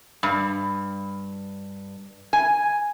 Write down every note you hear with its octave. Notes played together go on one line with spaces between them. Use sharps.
G2
G#5